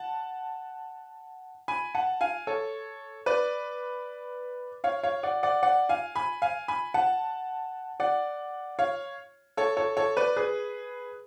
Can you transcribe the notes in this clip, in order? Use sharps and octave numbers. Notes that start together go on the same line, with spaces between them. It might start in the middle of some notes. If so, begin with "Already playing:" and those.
Already playing: F#5 A5
G#5 B5
F#5 A5
F5 G#5
A4 C#5
B4 D5
C#5 F5
C#5 F5
D5 F#5
D5 F#5
D5 F#5
F5 G#5
G#5 B5
F5 G#5
G#5 B5
F#5 A5
D5 F#5
C#5 F5
A4 C#5
A4 C#5
A4 C#5
B4 D5
G#4 B4